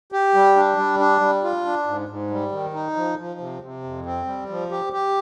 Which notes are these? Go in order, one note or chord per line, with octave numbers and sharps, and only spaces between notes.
G4
G3
D4
G3
D4
G3
F4
D4
G#2
G#2
G3
D#3
D#4
F3
F3
C3
C3
F2
C4
G3
F3
G4
G4